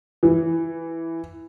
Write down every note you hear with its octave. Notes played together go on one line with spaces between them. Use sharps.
E3